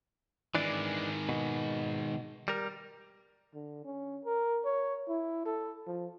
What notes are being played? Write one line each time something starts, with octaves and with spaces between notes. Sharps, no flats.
D#3 E3 G#3 D4 D5
B2
G3 A#4
D3
C#4
A#4
C#5
E4
A4
F3